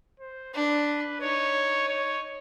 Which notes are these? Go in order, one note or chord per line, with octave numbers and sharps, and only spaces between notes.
C5
D4 B4
D#4 C#5
C#5